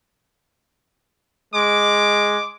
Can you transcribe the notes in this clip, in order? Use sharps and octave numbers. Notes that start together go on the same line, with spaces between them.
G#3 D6